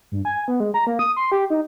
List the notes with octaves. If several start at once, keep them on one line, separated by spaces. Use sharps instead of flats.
G2
G#5
B3
G#3
A#5
A#3
D#6
C6
G4
D#4